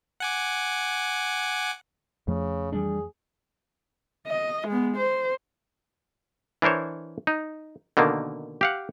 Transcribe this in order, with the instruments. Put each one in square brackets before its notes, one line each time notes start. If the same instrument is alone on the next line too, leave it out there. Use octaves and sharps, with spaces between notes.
[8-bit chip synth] F#5 G#5 D6
[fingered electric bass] F2 F3 A3 [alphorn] C#3
[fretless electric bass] E3 G3 D4 [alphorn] G#4
[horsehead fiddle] D#5
G#3 B3
C5
[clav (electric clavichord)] E3 D4 A#4 C5 C#5
D#4
B2 D3 D#3 A#3
G4 F5 F#5